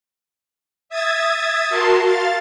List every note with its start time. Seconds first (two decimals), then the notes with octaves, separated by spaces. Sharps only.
0.89 E5 D#6 G#6 A6
1.69 F#4 A#4 A5 C6
2.03 F5 A6